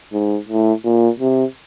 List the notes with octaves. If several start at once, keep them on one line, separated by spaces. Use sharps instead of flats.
G#2
A2
A#2
C3